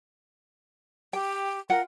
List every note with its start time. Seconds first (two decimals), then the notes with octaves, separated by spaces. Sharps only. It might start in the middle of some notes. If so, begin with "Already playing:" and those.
1.13 G4 G5
1.70 F4 A#4 F#5 G5